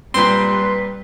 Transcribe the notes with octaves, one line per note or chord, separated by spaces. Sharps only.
A#2 G3 C4 B4 C6